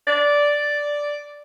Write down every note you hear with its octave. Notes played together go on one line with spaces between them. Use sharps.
D5